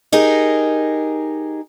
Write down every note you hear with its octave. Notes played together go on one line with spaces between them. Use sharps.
D#4 G4 G#4 A#4